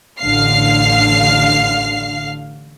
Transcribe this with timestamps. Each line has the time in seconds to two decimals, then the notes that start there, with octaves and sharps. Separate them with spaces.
0.20 A1 D3 F5 F6 C7